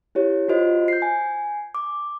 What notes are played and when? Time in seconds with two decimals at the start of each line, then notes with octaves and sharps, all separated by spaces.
0.15 E4 G4 C#5
0.48 F4 F#4 C5 D#5
0.88 G6 C7
1.02 G#5
1.75 D6